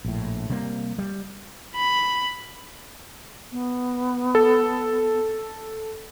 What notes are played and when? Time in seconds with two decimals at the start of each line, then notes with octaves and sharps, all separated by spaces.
0.05 A#1 A2
0.50 C3 G3 A#3
0.98 G3
1.76 B5
3.52 B3
4.35 A4